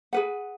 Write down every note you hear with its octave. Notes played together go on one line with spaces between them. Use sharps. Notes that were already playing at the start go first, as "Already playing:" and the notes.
G#4 B4 F#5